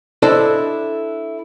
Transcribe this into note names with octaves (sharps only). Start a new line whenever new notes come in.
D4 E4 A4 C5 D5 D#5